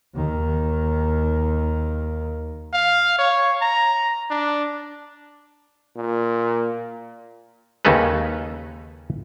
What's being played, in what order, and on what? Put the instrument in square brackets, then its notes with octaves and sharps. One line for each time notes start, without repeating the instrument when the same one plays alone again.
[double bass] D#2 D#3
[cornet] F5
C#5
A#5
D4
[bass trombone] A#2
[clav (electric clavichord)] D#2 C#3 C#4 D#4 A4 B4